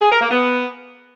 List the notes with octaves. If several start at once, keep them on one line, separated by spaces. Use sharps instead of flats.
G#4
A#4
A#3
B3